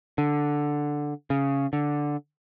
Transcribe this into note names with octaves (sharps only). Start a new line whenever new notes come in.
D3
C#3
D3